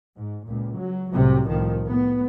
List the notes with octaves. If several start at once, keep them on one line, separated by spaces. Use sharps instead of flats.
G#2
C#2 A#2
F#3
C2 A2 C3 F#3
C2 A2 D#3 F3
A2 B3